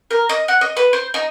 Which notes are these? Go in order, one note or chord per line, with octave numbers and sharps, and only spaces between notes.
A#4
D#5
F#5
D#5
B4
C5
D#4